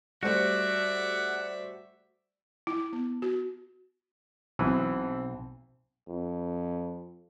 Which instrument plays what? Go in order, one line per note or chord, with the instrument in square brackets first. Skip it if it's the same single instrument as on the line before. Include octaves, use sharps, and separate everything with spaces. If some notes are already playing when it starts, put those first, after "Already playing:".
[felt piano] G3 A3 C5 [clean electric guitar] F#4 [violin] D5 E5 [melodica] F#5
[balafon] E4
B3
F#4
[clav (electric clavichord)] B1 [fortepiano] E3 [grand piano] C4
[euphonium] F2